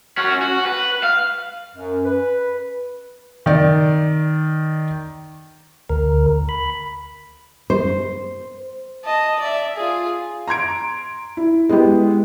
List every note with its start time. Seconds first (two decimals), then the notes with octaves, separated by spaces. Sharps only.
0.17 C#4 F#4
0.42 F#4
0.66 B4
1.03 F5
1.75 F#2
2.05 B4
3.46 D#3 D5
5.90 D2 A#4
6.49 B5
7.70 C5
9.05 D#5 A5
9.40 D5 E5
9.76 F4 G#4
10.48 A#5 C6 G#6 D7
11.37 E4
11.69 G#3 B3 E4 G4